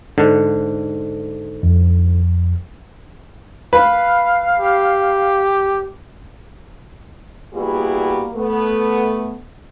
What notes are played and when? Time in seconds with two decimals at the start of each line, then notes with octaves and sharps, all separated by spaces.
0.18 G#2 D3
1.63 F2
3.73 B4 F5
4.60 G4
7.54 G3 A#3 B3 E4 F#4 G#4
8.35 A3 B3